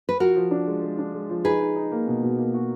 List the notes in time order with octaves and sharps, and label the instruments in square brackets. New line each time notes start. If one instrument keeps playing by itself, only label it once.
[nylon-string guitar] B4
[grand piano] F3 [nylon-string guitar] F#4 A#4
[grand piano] F3
D4
G#3
G#3
D4
G#3
F3
[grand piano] D#4 [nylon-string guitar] G#4 B4
[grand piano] D#4
D#4
A#3
B2
B2
A#3
F#4